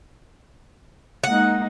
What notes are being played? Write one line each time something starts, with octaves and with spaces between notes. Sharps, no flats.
G#3 A#3 D#4 F#5